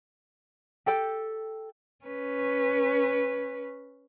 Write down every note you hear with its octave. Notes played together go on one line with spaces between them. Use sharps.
G4 A4 G5
C#4 B4